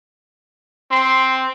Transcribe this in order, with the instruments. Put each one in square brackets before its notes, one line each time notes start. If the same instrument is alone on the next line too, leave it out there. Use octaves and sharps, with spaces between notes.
[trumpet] C4 [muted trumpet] C6